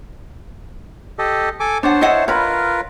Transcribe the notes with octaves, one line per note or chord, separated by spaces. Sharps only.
G4 A4 D#5
A4 G#5 D6
D4 C5 C#5 F#5 A5
E4 D#5 F#5
F4 A#4 B4 C#5 B5